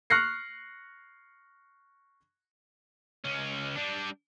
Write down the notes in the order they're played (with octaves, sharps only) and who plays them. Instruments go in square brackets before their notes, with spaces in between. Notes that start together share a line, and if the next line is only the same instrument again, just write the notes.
[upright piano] C#6 F6 F#6 A#6 C7 C#7
[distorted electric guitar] C#2 C#4
G3 D4